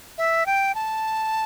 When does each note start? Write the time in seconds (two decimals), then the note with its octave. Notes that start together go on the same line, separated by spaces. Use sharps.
0.18 E5
0.46 G5
0.75 A5